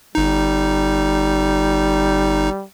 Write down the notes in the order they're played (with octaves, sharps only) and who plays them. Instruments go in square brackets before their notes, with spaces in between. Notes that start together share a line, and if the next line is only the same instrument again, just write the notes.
[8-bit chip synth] G1 D#4 [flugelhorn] G3